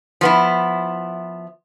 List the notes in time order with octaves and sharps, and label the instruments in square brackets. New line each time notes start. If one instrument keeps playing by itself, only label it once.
[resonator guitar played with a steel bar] F3 B3 E4